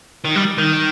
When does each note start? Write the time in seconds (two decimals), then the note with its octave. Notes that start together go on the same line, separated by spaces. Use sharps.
0.25 D#3
0.35 G3
0.58 D#3